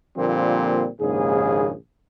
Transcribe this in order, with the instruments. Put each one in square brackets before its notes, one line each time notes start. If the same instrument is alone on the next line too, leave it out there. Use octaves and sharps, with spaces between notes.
[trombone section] A#2 D3 F3 G3 A#3 C4
A#1 D#2 G#2 C#3 G#4